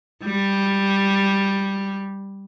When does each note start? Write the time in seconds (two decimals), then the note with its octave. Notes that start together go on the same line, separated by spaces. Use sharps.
0.24 G3